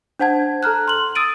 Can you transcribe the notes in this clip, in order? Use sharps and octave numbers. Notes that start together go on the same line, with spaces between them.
D4 C5 F#5 A5 G#6
A4 A#5 F6 F#6
C6 F#7
D#6 E6 A6 D7 D#7